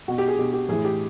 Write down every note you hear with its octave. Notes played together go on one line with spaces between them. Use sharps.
B2 F#4
G4
G#4
B2 G4
G4
A2 E3 G#4
G4